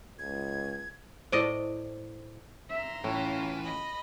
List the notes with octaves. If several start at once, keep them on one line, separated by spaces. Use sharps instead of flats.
C#2 G#6
A2 E4 C5 D5 D#5
E5 A#5 C6
A2 E3 C#4 F4
D#5 B5